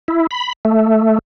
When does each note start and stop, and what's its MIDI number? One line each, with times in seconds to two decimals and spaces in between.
0.08 0.27 64
0.31 0.53 83
0.65 1.19 57